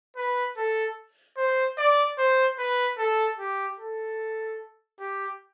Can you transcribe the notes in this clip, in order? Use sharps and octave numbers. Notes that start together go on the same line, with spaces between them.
B4
A4
C5
D5
C5
B4
A4
G4
A4
G4